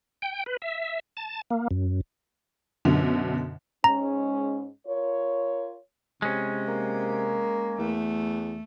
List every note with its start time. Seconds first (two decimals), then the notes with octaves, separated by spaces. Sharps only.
0.22 G5
0.46 B4
0.62 E5
1.17 A5
1.51 A#3
1.71 F#2
2.85 F#2 B2 D3
3.84 G#2 G#3 C#4 A#5
4.87 F4 A#4 C#5
6.22 C3 G#3 C#4
6.68 A#3
7.79 E2 A3